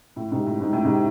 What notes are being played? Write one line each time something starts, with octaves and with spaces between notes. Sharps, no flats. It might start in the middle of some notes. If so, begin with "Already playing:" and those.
A2
G#2 C3
A2
G#2
A2
G#2 C3